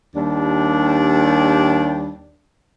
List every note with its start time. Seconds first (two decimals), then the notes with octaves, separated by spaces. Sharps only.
0.16 D#2 G3 D4